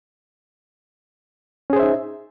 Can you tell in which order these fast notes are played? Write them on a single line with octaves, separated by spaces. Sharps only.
C#4 G#4 C5 E5 D#4